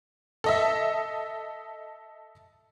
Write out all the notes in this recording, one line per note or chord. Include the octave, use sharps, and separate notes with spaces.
A4 D#5 E5